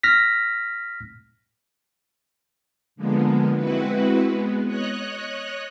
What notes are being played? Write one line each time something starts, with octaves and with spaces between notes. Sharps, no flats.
F6 A#6 B6
D3 F3 G#3 A#3 B3
G#3 C4 E4 F#4 B4
G#3 B3
C#5 D#5 F#6